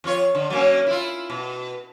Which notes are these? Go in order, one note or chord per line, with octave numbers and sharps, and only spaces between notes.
F2 F4 C#5
D3
F#3 A#3 C#4
E4 F4
B2